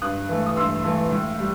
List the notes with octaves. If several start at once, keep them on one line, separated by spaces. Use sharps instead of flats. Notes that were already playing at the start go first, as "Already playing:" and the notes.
G2 D#6 F#6
E3 A3
D#6
G2 C6 E6
E3 A3
A2
G3